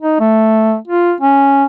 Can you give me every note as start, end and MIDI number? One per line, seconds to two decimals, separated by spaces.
0.02 0.18 63
0.20 0.76 57
0.88 1.13 65
1.21 1.64 61